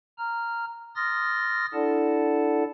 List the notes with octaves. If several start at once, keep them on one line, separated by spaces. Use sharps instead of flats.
A#5 F6
C6 D#6 F6 A6 A#6
D4 E4 A4 D5 F#5 A5